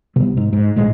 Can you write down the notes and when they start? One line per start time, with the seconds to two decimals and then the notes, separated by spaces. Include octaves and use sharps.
0.16 C2 C3 G3 B3
0.37 G#2
0.53 G#2
0.76 A#1 A2 G#3